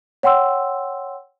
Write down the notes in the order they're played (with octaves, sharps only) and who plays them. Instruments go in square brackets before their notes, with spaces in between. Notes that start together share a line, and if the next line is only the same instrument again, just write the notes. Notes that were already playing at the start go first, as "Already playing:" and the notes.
[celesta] C#5 F#5 G5 C6 E6